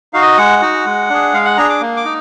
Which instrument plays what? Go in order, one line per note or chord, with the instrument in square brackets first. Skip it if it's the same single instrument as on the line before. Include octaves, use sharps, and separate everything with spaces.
[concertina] D#4 F#4 F5
D#5
G#3 F#5
D#4 F#4
G#3
D4 G#4
G#3 F5
F#5
D4 G#4 A#5
D6
A#3
D6
D#4